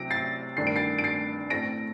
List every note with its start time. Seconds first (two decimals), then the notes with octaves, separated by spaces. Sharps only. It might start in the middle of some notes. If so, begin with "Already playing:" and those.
Already playing: C3 F#3 C4 A#6 D7
0.10 A6 C7
0.57 G2 D#3 A3 D4 C7
0.67 D7
0.76 A6 C7
0.99 D7
1.04 A6 C7
1.50 A2 A3 C4 A#6 D7